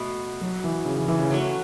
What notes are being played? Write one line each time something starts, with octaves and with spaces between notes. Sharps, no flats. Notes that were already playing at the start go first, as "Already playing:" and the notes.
Already playing: B2 A3 B3 F#4
F#3
E3
C#3
E3
E3
C#3
F#3 A3 C#4 F#4